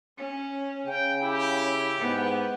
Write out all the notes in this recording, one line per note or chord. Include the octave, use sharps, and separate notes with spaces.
C#4
C#3 G5
E4 G4
G#2 B3